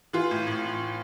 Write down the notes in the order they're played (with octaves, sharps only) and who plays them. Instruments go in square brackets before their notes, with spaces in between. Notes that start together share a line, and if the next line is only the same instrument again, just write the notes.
[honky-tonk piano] E3 F4
A2
A2